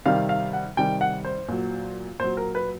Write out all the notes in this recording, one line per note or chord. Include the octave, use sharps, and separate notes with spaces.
C3 D#3 G3 F5
F5
F#5
C3 D#3 G3 G5
F#5
C5
A#2 F#3
A#2 F#3 C5
A#4
B4